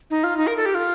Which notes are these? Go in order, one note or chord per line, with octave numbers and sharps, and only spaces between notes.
D#4
F4
D#4
A#4
A4
G4
F4